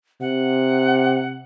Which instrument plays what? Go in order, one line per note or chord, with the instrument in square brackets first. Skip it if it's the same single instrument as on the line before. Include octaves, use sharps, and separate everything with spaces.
[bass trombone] C3 [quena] F#5